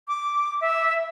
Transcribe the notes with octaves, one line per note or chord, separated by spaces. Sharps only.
D6
E5